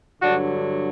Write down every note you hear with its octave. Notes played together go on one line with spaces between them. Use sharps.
G2 D3 F#3 D4 F#4